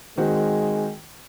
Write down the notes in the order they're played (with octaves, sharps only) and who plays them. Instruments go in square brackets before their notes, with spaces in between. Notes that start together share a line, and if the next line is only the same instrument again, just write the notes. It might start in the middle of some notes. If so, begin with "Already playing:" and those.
[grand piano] D#3 C4 F#4 [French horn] G#3